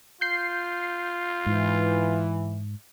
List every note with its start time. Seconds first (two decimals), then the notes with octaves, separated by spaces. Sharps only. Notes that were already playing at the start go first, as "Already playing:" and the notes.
0.21 F4 G6 C7
1.46 G#2 E3